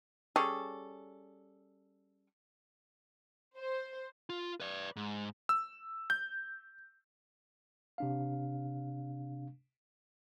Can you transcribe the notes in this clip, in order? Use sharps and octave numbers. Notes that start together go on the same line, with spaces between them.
G3 C#4 G#4 A4
C5
F4
B4 D5
G#2
E6
G6
C3 D4 F5